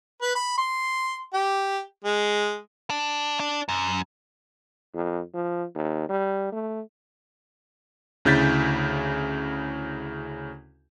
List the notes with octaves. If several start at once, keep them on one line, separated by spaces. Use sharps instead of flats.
B4
B5
C6
G4
G#3
D4
D4
F#2
F2
F3
D#2
G3
A3
D2 C#3 E4 G6 A6 B6